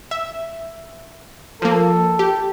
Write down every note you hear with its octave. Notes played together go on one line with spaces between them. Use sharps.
E5
F3 A#3 A4
G4